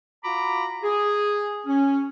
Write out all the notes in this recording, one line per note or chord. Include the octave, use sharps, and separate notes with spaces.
F4 F#4 A#5 B5 D6
G#4
C#4